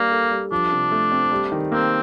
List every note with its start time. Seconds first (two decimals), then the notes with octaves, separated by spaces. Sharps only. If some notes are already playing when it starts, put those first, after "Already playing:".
Already playing: G3 A#3 D4
0.12 A4
0.31 G3
0.52 F3 D4
0.72 C3
0.92 A3
1.12 C4
1.31 G3
1.52 D#3
1.72 A#3 C4